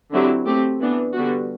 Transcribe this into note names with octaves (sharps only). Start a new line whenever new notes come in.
D3 F#3 C4 E4 G4
A3 C4 G4
E3 B3 D4
D3 G3 B3 F#4